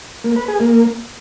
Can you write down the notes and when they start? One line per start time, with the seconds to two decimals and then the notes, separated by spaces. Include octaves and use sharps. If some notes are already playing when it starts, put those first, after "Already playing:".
0.24 A#3
0.36 B4
0.48 G#4
0.60 A#3